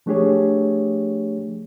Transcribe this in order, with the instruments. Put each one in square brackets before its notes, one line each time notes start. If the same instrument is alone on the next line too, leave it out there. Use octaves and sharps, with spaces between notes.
[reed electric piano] F3 A3 D4 G4 G#4 C#5